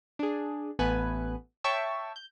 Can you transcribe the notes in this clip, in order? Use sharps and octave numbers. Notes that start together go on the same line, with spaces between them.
D4 G#4
A1 A3 B3 B4 G#5 F#6
C#5 E5 G5 A5 C#6 E6
G6